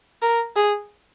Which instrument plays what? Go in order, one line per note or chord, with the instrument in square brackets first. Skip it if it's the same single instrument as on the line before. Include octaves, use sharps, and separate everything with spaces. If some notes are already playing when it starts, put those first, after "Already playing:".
[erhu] A#4
G#4